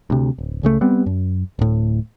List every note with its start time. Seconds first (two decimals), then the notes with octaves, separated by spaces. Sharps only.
0.10 D2 C3
0.38 D1
0.63 C#2 C#3 A3
0.81 G3 B3 C4
1.06 F#2
1.59 D1 A2